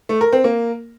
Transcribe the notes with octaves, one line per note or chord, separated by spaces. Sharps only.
A3
A#4
C4
A#3